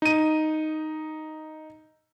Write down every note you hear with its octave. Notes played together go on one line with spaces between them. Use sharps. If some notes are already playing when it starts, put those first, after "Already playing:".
D#4 D#7